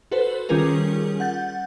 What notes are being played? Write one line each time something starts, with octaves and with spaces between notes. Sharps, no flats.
F#4 A4 B4 C5
D#3 G3 C#4 F4 G#4 A#4
F#5 G6 A6